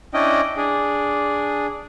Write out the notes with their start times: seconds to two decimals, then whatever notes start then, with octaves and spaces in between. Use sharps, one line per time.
0.14 C#4 D4 E4 D#5 G5
0.57 D4 G#4